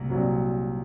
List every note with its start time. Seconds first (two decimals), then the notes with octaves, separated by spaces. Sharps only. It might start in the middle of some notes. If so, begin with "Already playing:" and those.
Already playing: C2 A#2
0.10 C2 A#2 F#3